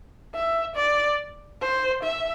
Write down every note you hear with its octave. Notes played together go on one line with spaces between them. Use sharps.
E5
D5
C5
E5